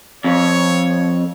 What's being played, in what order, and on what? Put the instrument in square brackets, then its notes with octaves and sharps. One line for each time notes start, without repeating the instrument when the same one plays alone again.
[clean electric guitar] F2 [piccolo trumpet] C#5